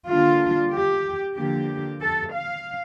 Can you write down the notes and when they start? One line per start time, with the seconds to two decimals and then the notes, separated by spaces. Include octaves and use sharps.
0.08 D3 G3 A#3 D4 F4
0.73 G4
1.37 D3 F3 A#3 G4
2.01 A4
2.33 F5